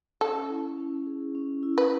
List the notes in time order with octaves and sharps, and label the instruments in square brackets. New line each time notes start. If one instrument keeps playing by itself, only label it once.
[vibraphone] C#4 [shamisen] A4
[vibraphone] E4
C#4
G#4
C#4
E4
[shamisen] B4